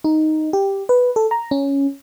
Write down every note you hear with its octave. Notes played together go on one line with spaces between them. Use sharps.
D#4
G4
B4
A4
A#5
C#4